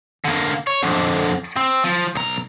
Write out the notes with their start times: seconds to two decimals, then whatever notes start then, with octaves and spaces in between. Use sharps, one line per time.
0.25 D3 A#3
0.67 C#5
0.83 F2 D3
1.57 C4
1.84 F3
2.15 B1 A#5